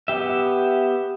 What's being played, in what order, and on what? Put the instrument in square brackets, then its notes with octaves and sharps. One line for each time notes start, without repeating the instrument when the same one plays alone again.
[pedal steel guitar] B3 G4 E5